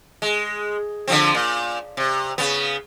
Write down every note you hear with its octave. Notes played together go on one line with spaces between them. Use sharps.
G#3
D3 F3 C4
A#2
C3
C#3 B3